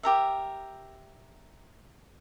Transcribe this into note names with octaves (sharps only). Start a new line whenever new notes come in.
G4 A#4 E5